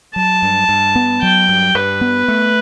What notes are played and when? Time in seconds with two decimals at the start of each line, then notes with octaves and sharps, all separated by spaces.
0.15 F#3 A5
0.42 G2
0.69 G2
0.95 B3
1.22 F#3 G5
1.49 G2
1.75 G2 B4
2.01 B3
2.28 A3